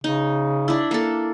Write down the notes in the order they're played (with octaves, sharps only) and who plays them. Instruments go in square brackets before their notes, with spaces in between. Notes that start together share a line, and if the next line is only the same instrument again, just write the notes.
[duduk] C#3 [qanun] D#4
[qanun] D4 E4
A#3 A4